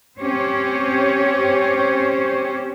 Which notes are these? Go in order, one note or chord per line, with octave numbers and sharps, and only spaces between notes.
C4 C#4 G4 C5 C#5